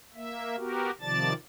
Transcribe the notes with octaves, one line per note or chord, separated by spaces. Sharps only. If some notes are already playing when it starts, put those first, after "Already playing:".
A#3 E5
B3 F#4 G4 A#4
C3 D#3 F3 D5 A5 A6